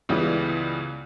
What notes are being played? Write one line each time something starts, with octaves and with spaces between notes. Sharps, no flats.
C#2 C#3 E3 G3 B3